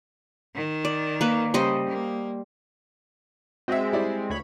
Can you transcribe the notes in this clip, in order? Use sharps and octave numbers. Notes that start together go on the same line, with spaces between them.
D#3
D5
A#3 B4
C#3 G3 C5 D#5
A#3
G#3 C4 F#4 E5
G3 E4 D5
D2 C#5 B5